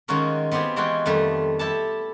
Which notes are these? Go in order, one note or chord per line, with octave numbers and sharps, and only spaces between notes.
D#3 G#3 C#4 F4 F#4 A#4
B3 C4 F4 G4 G#4
E3 G#3 B3 F4 F#4 G5
F2 D#3 G3 A3
E4 G4 A4 A5